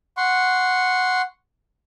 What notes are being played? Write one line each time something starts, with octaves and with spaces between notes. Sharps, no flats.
F#5 C6 C#6